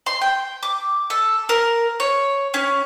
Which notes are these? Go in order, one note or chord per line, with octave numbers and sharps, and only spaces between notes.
C6
G5
D6
A4
A#4
C#5
C#4